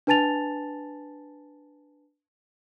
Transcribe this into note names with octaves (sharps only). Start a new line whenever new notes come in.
D4 B4 G#5 A5 A6 F7